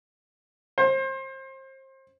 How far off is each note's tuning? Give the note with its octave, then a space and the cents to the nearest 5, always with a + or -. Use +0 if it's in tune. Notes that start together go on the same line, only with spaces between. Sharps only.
C5 +30